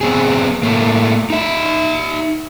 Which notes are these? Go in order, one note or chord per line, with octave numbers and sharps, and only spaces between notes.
B3 C4 G#4
A2 A3 A#3
D#4 E5